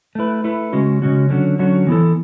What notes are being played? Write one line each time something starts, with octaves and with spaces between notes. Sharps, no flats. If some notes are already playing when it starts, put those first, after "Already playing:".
A3 E4 B4
A3 E4 B4
C#3 G#3 C#4 F#4
C#3 G#3 C#4 F#4
D3 F#3 C#4 F#4
D3 F#3 C#4 F#4
E3 B3 E4 A4